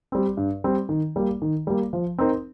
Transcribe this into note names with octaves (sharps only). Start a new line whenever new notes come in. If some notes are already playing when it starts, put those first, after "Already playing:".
G3 C4
G2
G3 C4
D#3
G3 A#3
D#3
G3 A#3
F3
C4 D#4 A#4